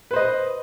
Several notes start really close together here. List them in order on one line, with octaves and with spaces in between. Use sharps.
B4 C5 D#5